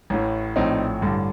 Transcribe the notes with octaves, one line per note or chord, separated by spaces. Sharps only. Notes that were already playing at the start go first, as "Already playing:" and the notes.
A1 A2
A#1 A2 C4 D#4
A1 G2 D3